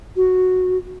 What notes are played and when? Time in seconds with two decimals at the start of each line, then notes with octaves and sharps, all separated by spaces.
0.16 F#4